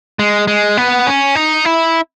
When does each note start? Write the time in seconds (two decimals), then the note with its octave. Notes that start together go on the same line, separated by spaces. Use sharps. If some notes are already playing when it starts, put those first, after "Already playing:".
0.19 G#3
0.48 G#3
0.77 B3
1.07 C#4
1.35 D#4
1.65 E4